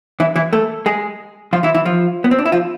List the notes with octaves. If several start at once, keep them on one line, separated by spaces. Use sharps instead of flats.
E3 E4
E3 E4
A3 A4
G#3 G#4
F3 F4
E3 E4
E3 E4
F3 F4
B3
C4
D4
E4
F3 F4